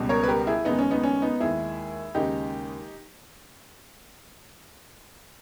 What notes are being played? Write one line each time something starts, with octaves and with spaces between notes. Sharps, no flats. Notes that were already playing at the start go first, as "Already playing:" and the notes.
Already playing: C#2 B2 G3
A#4 C#5
B4
G4 A#4
E4 G#4
D#2 C#3 G#3 B3 D#4
C#4
B3 D#4
C#4
B3 D#4
D#2 D#3 G#3 E4 G#4
D#2 C#3 G#3 D#4 G4